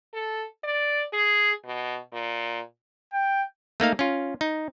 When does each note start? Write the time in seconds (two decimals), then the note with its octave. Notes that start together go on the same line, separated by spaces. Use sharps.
0.13 A4
0.64 D5
1.13 G#4
1.65 B2
2.13 A#2
3.13 G5
3.80 A3 A#3 D#4 F5
3.99 C#4 F4
4.41 D#4